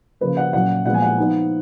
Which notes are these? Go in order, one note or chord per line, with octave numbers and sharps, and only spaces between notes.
C#3 F3 A#3 B4
F#5
A#2 F#3 A#3 C#4 F#5
A#2 F3 G#3 B3 F#5
G#5
F#5
F3 B3 D#4